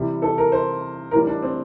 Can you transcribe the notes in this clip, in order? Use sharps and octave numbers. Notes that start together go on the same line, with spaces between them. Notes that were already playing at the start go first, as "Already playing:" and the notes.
Already playing: C3 E3 G3
A4
A#4
C5
A2 E3 G3 A#4
D4
C4